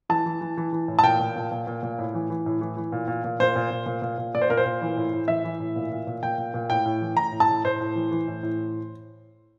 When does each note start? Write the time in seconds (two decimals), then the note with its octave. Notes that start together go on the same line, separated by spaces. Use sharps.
0.09 E3 A5
0.26 E3
0.41 E3
0.57 E3
0.73 E3
0.88 A2
0.99 A5
1.03 A#2 G5
1.19 A#2
1.36 A#2
1.51 A#2
1.67 A#2
1.83 A#2
1.99 A2
2.14 E3
2.30 E3
2.46 A2
2.61 E3
2.77 E3
2.92 A#2
3.08 A#2
3.24 A#2
3.40 A#2 C5
3.56 A#2
3.71 A#2
3.86 A#2
4.02 A#2
4.18 A#2
4.35 A#2 D5
4.41 C5
4.49 A#2 A#4
4.57 C5
4.65 A#2
4.81 E3
4.97 A2
5.13 A2
5.28 E3 E5
5.44 E3
5.60 A2
5.76 A#2
5.91 A#2
6.07 A#2
6.23 A#2 G5
6.38 A#2
6.54 A#2
6.70 A2 G5
6.85 A2
7.01 E3
7.17 A2 A#5
7.32 A2
7.40 A5
7.48 A2
7.64 A2 C5
7.80 A2
7.95 E3
8.11 E3
8.28 A2
8.43 A2